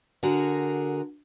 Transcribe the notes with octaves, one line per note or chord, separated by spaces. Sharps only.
D3 F#4 G#4 A#4